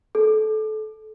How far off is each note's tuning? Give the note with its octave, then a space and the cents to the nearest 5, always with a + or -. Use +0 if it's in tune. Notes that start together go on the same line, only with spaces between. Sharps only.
A4 -25